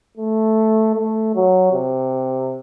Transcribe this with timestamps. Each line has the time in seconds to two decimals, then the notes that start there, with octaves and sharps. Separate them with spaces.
0.17 A3
0.95 A3
1.35 F#3
1.73 C3